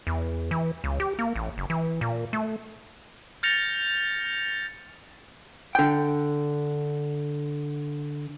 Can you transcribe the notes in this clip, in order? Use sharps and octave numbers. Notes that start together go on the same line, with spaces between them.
E2
E3
C#2
G4
A#3
A1
F#1
E3
A#2
A3
F6 G6 A6 A#6 C#7 F7
D3 G5